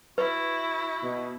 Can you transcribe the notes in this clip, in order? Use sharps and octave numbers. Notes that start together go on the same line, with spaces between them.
E4 F#4 B4
B2